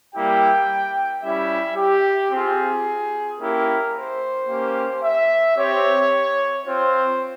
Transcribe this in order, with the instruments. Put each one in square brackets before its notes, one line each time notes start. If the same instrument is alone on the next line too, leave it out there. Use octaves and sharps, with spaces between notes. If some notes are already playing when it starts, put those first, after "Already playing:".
[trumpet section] G3 A#3 E4 G4 G5
G3 C#4 E4 G4 E5
G4
C4 F4 G#4
A#3 C#4 E4 G4 A#4
C5
A#3 C#4 G4
E5
C4 G4 C#5
C4 F4 C5